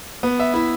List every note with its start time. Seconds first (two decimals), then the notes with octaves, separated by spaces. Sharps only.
0.23 B3
0.40 E5
0.54 E4